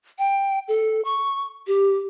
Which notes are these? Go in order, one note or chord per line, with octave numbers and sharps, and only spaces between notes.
G5
A4
C#6
G4